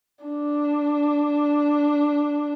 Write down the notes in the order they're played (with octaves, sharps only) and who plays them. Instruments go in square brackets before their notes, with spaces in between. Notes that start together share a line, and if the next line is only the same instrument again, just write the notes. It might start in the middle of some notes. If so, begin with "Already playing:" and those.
[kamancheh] D4